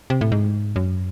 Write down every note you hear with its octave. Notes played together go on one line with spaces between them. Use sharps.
C3
A2
G#2
F#2